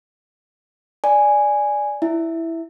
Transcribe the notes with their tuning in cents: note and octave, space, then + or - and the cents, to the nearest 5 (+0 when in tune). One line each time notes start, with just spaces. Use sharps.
D5 +0 G#5 +0
E4 +0 E5 +0